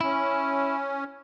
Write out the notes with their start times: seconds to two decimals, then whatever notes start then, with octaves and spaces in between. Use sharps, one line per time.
0.01 C#4 E4